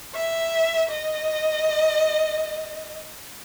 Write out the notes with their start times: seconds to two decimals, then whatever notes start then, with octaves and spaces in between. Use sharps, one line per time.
0.14 E5
0.90 D#5